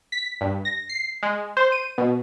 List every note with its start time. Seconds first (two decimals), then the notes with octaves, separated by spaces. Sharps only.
0.12 B6
0.41 G2
0.65 A#6
0.89 C7
1.23 G#3
1.57 C5
1.72 D#7
1.98 B2